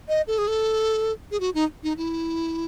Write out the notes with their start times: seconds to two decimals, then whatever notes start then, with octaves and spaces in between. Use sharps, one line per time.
0.08 D#5
0.27 A4
0.38 G#4
0.48 A4
1.31 G#4
1.40 F#4
1.54 D#4
1.83 D#4
1.97 E4